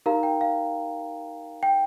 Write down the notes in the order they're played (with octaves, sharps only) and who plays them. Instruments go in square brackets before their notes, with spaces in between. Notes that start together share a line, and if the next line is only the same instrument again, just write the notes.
[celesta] D#4 G4 A#4 F5 A#5
G5
F5
G5